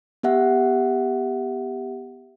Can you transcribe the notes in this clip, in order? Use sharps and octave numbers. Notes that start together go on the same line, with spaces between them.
B3 G4 E5 F#5